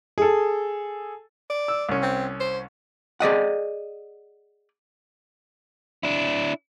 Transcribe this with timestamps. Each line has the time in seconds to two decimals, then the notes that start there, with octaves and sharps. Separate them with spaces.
0.18 G#4 A4
1.50 D5
1.68 E6
1.89 C2 C#4
2.02 C4
2.40 C5
3.20 G#4 D5 D#5 F#5
6.03 D4 E4